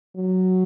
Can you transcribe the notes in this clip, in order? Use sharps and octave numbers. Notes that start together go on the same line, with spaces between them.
F#3